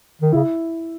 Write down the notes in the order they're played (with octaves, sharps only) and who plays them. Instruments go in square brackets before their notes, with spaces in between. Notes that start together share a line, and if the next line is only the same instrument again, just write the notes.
[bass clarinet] D#3
[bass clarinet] C#3 [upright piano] E4